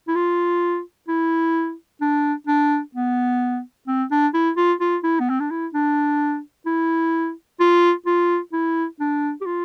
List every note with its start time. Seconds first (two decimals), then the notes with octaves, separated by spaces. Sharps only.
0.08 E4
0.15 F4
1.08 E4
2.01 D4
2.47 D4
2.95 B3
3.87 C4
4.11 D4
4.34 E4
4.57 F4
4.81 F4
5.03 E4
5.20 B3
5.29 C4
5.40 D4
5.50 E4
5.74 D4
6.66 E4
7.60 F4
8.06 F4
8.53 E4
9.00 D4
9.41 G4
9.46 F4